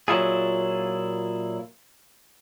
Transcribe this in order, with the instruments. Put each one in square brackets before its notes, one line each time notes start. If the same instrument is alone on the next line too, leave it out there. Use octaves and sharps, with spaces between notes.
[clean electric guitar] A#2 F#3 E4 F4 G#4